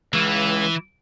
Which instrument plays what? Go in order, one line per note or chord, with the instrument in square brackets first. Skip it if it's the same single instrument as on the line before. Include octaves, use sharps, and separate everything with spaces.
[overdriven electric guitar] C#2 [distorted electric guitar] E3